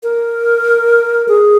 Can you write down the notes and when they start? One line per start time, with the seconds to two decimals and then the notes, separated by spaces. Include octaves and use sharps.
0.03 A#4
1.28 G#4